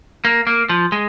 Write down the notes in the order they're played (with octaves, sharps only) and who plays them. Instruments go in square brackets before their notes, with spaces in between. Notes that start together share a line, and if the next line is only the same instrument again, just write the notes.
[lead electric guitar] A#3
A#3
F3
G#3